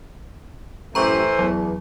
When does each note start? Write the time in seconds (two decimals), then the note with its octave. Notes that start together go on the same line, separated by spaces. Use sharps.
0.95 F#2 A2 E3 A3 G4 C5 A#5 C#6
1.39 E2 F#3